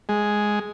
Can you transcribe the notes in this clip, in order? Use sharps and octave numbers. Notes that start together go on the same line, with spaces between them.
G#3